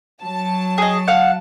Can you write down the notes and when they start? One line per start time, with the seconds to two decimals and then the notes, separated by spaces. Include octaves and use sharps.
0.22 F#3 A5
0.78 G#4 D#5
1.08 F5 F#5